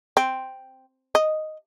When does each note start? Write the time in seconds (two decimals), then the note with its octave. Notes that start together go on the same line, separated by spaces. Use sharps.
0.17 C4
1.15 D#5